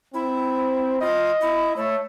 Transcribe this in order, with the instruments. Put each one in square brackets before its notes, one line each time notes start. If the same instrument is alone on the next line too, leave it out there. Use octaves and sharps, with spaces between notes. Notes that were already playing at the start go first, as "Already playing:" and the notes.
[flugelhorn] C4 [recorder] E4
[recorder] F4 [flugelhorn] D#5
[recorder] E4
[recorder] A3 [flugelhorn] C#5